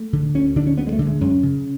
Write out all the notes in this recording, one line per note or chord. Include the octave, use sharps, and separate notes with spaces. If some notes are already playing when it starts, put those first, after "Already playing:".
Already playing: A3
D3
D2 C#4
D3 D4
C#4
D2 B3
G#3
A3
D3
G#3
F#2 C#4
C#3